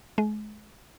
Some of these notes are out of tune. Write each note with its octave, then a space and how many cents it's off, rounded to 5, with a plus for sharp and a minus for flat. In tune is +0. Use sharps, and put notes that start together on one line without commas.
G#3 +35